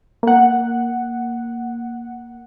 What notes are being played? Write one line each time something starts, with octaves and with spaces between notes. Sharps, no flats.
A#3 F#5